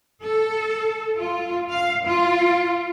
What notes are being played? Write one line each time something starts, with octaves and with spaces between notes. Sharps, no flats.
A4
F4
F5
F4